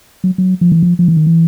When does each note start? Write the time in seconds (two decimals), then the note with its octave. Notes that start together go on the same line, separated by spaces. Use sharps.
0.24 F#3
0.38 F#3
0.61 F3
0.72 E3
0.83 F3
0.99 F3
1.08 E3
1.17 D#3
1.27 E3